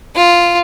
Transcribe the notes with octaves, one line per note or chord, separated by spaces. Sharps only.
F4